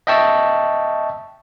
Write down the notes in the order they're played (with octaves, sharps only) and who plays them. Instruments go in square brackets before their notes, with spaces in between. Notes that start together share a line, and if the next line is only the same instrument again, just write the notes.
[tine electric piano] D#5 E5 G5 A5 C#6 E6